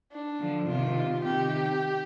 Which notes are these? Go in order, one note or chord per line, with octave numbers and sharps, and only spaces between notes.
D4
D3 F3
C3 D#3 F4
C3 D#3 G4